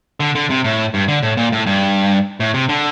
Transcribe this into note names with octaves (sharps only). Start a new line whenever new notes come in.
D3
D3
C3
A2
G2
D3
A2
A#2
A2
G2
A2
C3
D3